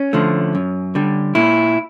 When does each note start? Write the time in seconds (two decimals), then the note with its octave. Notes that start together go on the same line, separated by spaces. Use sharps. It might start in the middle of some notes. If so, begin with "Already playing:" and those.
Already playing: C#4
0.13 D3 F3 A3
0.55 F#2
0.95 D3 G3
1.35 A#2 E4